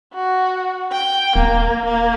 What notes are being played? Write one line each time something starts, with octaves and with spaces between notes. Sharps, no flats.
F#4
G5
D#1 A#3
A#3